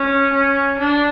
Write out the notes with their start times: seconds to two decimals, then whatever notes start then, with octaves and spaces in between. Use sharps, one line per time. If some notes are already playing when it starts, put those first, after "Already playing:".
Already playing: C#4
0.33 C#4
0.79 D4